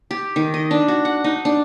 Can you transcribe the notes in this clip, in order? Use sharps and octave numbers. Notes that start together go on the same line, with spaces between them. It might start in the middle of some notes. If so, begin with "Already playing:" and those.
G4
D#3
D#5
D4
F#4
F#5
D#4
D4